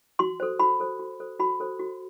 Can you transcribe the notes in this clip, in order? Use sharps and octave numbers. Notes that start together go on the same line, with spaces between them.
F#4 C6
A4 C5
F#4 B5
A4 C5
F#4
A4 C5
F#4 B5
A4 C5
F#4